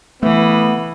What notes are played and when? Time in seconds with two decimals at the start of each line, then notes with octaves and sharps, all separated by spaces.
0.23 E3 A3 B3